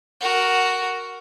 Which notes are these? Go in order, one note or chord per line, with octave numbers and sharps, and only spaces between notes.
F#4 A#4